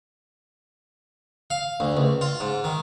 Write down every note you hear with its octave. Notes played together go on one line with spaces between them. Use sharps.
F5
D2
C#2
F4
G#2
D#3